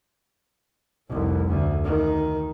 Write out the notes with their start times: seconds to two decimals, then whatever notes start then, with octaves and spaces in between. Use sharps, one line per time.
1.09 F1 C2
1.48 D2
1.84 D#3